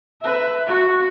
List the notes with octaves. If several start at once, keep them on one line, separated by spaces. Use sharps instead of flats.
B4 E5
F#4